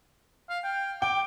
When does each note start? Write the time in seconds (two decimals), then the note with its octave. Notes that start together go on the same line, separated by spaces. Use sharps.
0.50 F5
0.64 G5
1.02 G5 D6